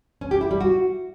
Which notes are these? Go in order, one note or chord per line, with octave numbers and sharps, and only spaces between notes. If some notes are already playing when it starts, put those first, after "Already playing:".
C#4
G4
E4
G3
F#4